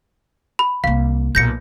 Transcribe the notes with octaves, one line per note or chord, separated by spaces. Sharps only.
B5
C2 A#3 F5
B1 A#2 G6 A#6 C#7